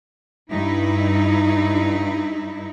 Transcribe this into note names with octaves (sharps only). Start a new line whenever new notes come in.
G2 D#4 E4